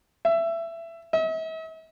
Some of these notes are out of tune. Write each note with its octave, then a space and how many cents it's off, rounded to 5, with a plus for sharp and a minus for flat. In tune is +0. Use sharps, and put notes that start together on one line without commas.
E5 +20
E5 -45